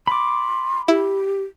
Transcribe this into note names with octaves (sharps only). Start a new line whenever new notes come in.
B5 C6 D6
E4 G4